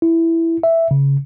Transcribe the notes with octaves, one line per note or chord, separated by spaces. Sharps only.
E4
E5
C#3